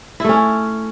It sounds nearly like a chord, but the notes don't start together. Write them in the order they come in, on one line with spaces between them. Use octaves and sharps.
E4 A3 C#4